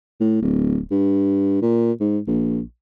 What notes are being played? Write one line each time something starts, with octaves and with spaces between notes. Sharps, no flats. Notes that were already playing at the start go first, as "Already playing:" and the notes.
A2
D1
G2
A#2
G#2
A#1